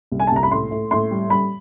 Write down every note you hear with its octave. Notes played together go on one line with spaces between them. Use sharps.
C2
G#5
A5
C2 A#5
B5
A2 C6
A2
A2 C6
G3
G3 B5